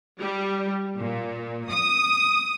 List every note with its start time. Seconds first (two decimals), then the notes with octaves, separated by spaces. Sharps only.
0.19 G3
0.98 A#2
1.70 D#6